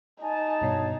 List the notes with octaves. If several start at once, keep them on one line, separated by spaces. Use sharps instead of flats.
D#4 G#5 A5
G2 B2 C#5